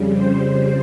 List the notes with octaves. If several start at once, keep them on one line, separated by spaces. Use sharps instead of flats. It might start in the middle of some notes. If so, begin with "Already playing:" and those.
Already playing: F2 C#3 G3
C5
C5